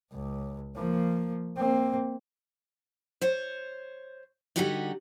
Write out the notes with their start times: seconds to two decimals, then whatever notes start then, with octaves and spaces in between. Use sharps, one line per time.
0.13 C#2
0.76 F3 A#3
1.57 A#3 C4
3.21 C5 C#5
4.56 D3 G3 D#4 F#4 G4 D#5